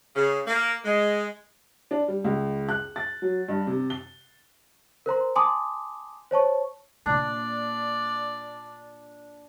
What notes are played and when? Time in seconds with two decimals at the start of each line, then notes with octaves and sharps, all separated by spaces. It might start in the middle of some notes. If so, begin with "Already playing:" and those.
0.15 C#3
0.46 A#3
0.85 G#3
1.91 D4
2.08 G3
2.24 C#2
2.69 F#6
2.96 A6
3.22 F#3
3.48 G2
3.67 C3
3.90 G7
5.06 A#4 C5 A#5 C6
5.36 G#5 A5 C6 D6 D#6
6.31 C5 C#5 A5 C#6
7.06 A#2 A#3 D4 D5